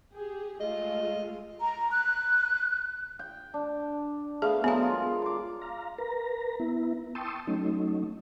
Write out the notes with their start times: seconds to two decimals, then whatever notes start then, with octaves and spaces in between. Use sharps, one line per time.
0.13 G4 G#4
0.60 G#3 A3 F4 D#5
1.61 A#5
1.91 F#6
3.19 G5
3.54 D4
4.42 A3 B3 G#4 F5
4.64 F#3 G#3 B3 A#4 F5
4.82 F4
5.22 C6 D6
5.62 F5 A#5
5.98 A#4 B4 A#5
6.60 B3 E4
7.15 G5 A5 C6 C#6 D#6 E6
7.47 F#3 A3 C#4 D#4